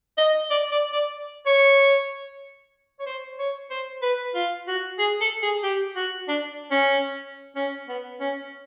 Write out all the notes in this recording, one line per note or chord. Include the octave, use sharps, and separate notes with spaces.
D#5
D5
D5
D5
C#5
C#5
C5
C#5
C5
B4
F4
F#4
G#4
A4
G#4
G4
F#4
D4
C#4
C#4
B3
C#4